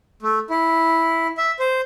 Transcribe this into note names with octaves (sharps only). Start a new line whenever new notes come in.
A3
E4
E5
C5